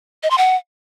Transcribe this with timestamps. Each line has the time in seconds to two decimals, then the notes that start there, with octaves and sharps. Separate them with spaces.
0.23 D#5
0.30 C6
0.38 F#5